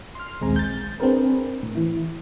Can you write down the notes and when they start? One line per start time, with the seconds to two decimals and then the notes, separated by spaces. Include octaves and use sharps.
0.15 C6 F6
0.41 A#1 D#2 G#3 C4 G#5 A#5
0.56 G6 A6
1.00 C4 D4 G#4 A#4 B4
1.63 A2
1.75 E3 E4